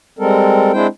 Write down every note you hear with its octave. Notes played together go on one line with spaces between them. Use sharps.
G3 G#3 C4 A4 A#4
G#3 C4 D4 E4 C5 G5